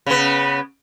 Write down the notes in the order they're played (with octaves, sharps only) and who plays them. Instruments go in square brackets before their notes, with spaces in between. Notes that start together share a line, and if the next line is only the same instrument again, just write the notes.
[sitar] C#3 B3